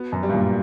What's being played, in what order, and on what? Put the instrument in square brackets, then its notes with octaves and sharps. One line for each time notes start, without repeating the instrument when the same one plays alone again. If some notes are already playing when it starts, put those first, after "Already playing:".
Already playing: [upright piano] B3 F#4
[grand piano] F#2
[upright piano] G3
[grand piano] G2
F#2 A#2